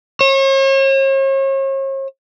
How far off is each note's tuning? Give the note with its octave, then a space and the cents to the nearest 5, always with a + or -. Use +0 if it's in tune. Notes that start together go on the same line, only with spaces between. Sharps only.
C#5 -40